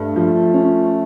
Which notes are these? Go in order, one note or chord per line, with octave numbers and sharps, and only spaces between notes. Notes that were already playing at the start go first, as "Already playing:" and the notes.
Already playing: G2 A3
F3
C#4